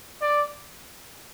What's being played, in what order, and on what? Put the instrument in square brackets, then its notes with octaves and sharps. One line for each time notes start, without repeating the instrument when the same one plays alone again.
[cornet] D5